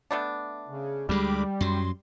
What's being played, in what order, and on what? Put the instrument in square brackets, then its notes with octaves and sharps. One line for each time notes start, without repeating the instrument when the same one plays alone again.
[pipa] A3 B3 D4
[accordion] C#3
[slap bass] D2 G#3 [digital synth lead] G3 [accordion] B5 D6
[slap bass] F#2 F#3 [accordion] C6